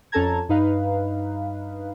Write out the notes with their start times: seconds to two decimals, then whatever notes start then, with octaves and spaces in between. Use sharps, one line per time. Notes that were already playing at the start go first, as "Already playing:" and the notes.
0.12 F2 C#4 A4 A5 A#5 G#6
0.49 G2 D#4 B4 F5